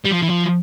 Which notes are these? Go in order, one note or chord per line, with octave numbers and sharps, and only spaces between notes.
G3
F3
E3
F3